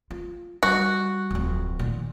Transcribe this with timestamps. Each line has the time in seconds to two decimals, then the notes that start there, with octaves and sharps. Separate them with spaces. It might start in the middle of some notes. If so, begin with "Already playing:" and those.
0.11 F4
0.63 G3 F#4
1.31 D1 F2
1.79 A#2 D#3